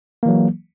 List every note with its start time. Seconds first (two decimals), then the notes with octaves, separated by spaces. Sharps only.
0.23 A#3
0.26 E3
0.28 F#3